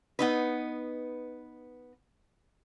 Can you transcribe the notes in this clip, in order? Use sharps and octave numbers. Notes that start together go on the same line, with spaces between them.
B3 D#4 B4